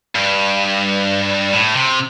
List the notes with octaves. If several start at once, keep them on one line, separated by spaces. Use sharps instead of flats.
G2
A2
C3